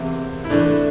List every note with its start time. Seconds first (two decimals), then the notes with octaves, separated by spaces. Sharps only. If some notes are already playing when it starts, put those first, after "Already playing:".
Already playing: E2 C3 E3 A#3 C4
0.44 E4
0.49 A2 E3 A3 D4